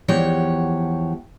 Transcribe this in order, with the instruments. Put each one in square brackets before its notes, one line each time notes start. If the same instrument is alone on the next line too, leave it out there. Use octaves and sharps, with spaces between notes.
[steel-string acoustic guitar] E2 E3 F3 G4 C#5 F#5